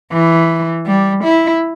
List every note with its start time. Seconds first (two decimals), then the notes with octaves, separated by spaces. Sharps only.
0.12 E3
0.86 G3
1.24 E4